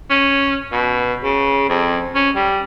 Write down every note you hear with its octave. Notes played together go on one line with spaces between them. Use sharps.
C#4
B2
C#3
F2
C#4
G3